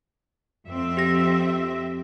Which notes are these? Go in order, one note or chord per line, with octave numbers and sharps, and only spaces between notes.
F2 C4 E5
G4 A#6